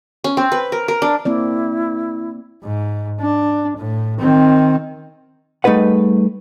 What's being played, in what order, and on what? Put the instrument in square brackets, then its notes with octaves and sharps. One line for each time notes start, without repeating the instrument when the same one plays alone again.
[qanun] C#4
C4
B4
A#4
A#4
D4
[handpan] A#3 C4 D5 [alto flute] E4
[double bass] G#2
D4
A2
D#3 C4
[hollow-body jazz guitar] G3 A3 D#4 G#4 B4 F#5